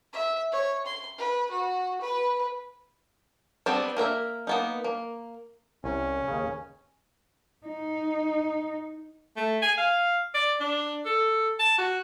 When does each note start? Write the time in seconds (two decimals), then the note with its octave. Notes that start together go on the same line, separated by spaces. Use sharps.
0.13 E5
0.52 C#5
0.86 C6
1.18 B4
1.51 F#4
2.01 B4
3.66 G3 B3 C4 D4
3.97 A#3 A#4 B4 E5
4.47 A#3 B3 D#4
4.84 A#3
5.84 C2 C#4
6.28 D#2 C#3
7.67 D#4
9.37 A3
9.62 G#5
9.78 F5
10.34 D5
10.61 D4
11.06 A4
11.59 A5
11.78 F#4